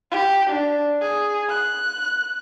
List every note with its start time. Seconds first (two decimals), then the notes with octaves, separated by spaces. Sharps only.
0.11 G4
0.50 D4
1.01 G#4
1.49 F#6